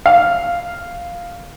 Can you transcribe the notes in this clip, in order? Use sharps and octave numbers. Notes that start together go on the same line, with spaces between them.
F5